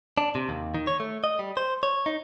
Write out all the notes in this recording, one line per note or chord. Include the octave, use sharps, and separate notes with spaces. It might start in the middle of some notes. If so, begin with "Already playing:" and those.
D4
C3
D#2
D#3
C#5
A3
D#5
G3
C5
C#5
D#4